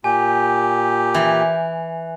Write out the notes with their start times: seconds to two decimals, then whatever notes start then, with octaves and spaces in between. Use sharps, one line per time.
0.04 A#2 G4 G#5
1.14 E3